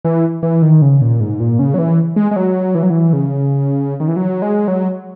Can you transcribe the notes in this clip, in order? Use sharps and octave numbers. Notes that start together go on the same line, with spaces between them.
E3
E3
D#3
C#3
A#2
G#2
A#2
C#3
F#3
E3
G#3
G#3
F#3
E3
F#3
E3
C#3
D#3
E3
F#3
G#3
F#3